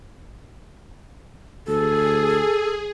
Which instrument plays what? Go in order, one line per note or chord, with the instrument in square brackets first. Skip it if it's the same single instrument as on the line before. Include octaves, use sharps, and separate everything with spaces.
[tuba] D2 [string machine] G#4 [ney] A4